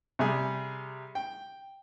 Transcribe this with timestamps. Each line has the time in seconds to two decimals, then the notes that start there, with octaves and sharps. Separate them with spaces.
0.19 C3 G3 G#4
1.15 G5